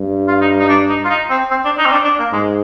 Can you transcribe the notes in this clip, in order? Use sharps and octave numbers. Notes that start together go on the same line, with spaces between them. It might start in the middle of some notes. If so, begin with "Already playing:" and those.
Already playing: G2
F4
D#4
D#4
D4
D#4
F4
D#4
C4
C4
D4
D#4
C4
D4
D4
A#3
G#2 G#3